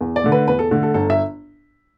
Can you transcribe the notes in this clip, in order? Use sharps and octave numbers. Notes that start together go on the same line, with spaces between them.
E2
D5
D3 A3
B4
E2 B4
A4
D3 A3
A4
G1 A4
E5